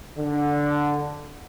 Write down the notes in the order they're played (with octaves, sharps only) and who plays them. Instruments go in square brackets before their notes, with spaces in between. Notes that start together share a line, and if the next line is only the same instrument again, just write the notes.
[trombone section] D3